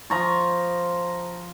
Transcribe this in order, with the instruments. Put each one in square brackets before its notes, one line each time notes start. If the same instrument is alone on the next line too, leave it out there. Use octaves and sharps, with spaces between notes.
[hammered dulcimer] F3 A#5 C#6